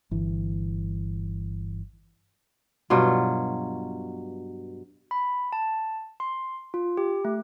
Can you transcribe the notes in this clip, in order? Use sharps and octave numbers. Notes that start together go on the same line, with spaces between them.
G1 E3
G2 B2 F#3 F4
B5
A5
C6
F4
G4
A3